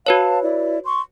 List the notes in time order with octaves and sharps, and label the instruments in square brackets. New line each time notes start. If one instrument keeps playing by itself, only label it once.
[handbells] F#4 B4 C#5 [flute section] F5 A5
[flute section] E4 D5
C6 C#6